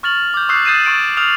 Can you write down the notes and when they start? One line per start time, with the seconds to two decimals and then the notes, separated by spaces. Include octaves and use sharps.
0.03 C#6 F6 A6 F7 F#7
0.34 D6 G6
0.49 C#6 D#6 E6 F#6 G6 C7
0.65 D#6 G6 A6 C7 D#7 E7
0.86 C#6 A6 D7
1.17 D#6 F6 G6 F7